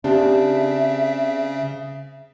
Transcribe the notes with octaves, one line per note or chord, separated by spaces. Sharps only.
C#3 C4 D4 G4 E5